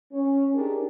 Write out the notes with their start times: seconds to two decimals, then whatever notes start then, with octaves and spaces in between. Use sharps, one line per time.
0.12 C#4
0.54 D4 D#4 G4 G#4 A#4